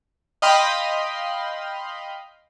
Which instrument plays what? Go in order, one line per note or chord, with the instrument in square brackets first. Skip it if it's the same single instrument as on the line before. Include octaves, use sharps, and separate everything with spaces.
[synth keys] D#5 F5 G5 B5 C6